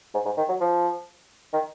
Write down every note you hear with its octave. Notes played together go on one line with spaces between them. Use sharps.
G#2
G#2
D#3
F#3
F3
D#3